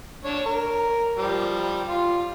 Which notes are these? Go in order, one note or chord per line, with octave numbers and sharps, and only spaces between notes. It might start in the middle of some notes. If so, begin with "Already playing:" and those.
D4 C#5
A#4
F3 G3
F4